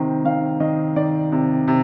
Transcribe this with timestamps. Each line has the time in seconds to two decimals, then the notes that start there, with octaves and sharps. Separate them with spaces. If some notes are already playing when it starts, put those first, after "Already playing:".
Already playing: C3 D#3 C5
0.25 D#3 F5
0.60 D#3 D#5
0.96 D#3 D5
1.32 C3
1.68 C3